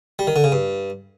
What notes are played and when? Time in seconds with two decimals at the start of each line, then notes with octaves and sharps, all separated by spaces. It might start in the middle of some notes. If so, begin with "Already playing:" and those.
0.19 G3
0.27 D#3
0.36 D3
0.44 C#3
0.52 G2